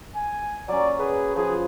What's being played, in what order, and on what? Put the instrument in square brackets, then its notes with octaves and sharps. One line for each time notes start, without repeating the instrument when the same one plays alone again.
[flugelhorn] G#5
[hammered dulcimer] F#3 C#4 [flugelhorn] D5
[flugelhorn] G#4 [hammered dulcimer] B4
[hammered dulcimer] F3 [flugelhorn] G#4